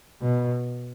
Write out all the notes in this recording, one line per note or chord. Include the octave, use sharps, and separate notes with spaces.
B2